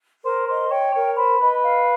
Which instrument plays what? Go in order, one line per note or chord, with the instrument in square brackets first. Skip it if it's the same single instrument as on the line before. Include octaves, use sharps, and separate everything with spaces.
[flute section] A#4 [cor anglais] C5
[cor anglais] C5 [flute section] D#5
[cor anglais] C#5 [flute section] G5
[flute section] A#4 [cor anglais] C#5
[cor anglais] C5 [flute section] B5
[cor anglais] B4 [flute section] D#5
[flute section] F5